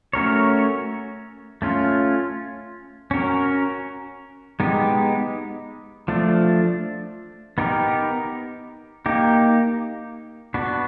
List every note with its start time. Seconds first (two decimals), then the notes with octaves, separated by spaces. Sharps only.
0.13 A3 C#4 F#4 A#4 C#5
1.62 A3 C#4 F4
3.11 C#4 F#4 A#4
4.60 G#3 B3 D#4 G4
6.08 F3 A3 D4
7.58 B3 D#4 G4 A#4
9.06 A#3 D#4 G4
10.54 B3 D4 F#4 B4